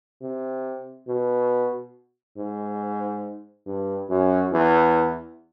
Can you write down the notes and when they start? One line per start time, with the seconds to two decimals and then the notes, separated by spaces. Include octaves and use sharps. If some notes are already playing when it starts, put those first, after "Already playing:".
0.22 C3
1.08 B2
2.38 G#2
3.66 G2
4.10 F#2
4.52 E2